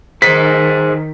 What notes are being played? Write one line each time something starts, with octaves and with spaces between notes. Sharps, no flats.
D#3 G#4 C5 B6